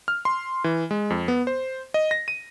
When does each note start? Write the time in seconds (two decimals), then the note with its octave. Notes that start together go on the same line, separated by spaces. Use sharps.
0.08 F6
0.25 C6
0.64 E3
0.91 G#3
1.10 F2
1.28 B3
1.47 C5
1.94 D#5
2.11 A#6
2.28 D#7